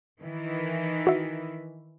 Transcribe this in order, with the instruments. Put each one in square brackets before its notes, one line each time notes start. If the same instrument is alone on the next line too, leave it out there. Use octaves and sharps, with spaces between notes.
[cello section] D#3 E3
[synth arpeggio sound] F#4 E5